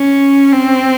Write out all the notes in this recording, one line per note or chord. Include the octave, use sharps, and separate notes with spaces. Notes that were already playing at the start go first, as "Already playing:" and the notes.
Already playing: C#4
C4